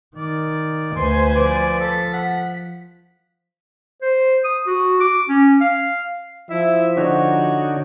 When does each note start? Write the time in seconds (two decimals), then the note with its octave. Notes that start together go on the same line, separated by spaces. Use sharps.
0.16 D#3 D5
0.96 D2 B4 C5 G#5 C6
1.36 F3 D5
1.80 A4 B6
2.13 F#5
4.02 C5
4.44 D#6
4.67 F#4
5.01 D6
5.29 C#4
5.61 F5
6.51 F3 E4 E5
6.97 D3 D4 D#4 F#4 C#5